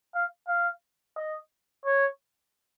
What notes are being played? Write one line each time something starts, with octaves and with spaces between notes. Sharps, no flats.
F5
F5
D#5
C#5